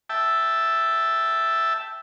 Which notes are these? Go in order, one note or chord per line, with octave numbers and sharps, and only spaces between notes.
E5 G5 A5